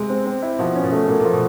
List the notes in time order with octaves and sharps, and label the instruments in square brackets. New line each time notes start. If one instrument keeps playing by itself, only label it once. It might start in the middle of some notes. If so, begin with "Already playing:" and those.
Already playing: [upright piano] C3 [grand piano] G#3
[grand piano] C4
C4
E4
[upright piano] B2 [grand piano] F3
[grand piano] C#4
[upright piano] B2
[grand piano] A3
[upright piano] A#2 [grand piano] A3
[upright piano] A#2 [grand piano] F3
[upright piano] B2